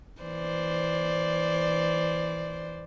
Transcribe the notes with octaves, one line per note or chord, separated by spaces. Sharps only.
E3 C5 D5